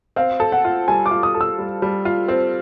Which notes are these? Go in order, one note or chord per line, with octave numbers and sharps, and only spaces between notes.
C4 F5
A4
F#5
F4
G3 G#5
D6
F4
D#6
A4
E6
G3
G3
F4
C4